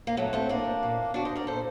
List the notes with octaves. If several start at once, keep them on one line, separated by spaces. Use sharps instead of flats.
A#3
A2 F#3 A3
A3 C4
A2 A#3 D4
A#2
A#2 D4 F#4
C5 D#5
A#4 D5
A#2 A4 C5